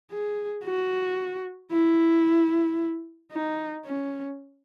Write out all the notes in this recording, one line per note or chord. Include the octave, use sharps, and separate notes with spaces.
G#4
F#4
E4
D#4
C#4